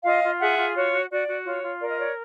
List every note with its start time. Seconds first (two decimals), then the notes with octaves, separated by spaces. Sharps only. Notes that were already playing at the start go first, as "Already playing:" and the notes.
0.04 F4 D#5 F5
0.23 F4
0.40 G#4 E5 F#5
0.58 F4
0.76 F#4 C#5
0.92 F#4
1.10 F#4 D5
1.28 F#4
1.45 F4 C#5
1.63 F4
1.80 A#4 D5
1.89 D#5
1.98 C#5 D5